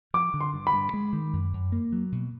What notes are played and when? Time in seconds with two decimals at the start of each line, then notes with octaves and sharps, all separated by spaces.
0.14 F3 D6
0.34 D3
0.41 C6
0.54 G2
0.67 B5
0.73 G2
0.93 G#3
1.13 D#3
1.33 F#2
1.53 F#2
1.72 A#3
1.92 F#3
2.12 B2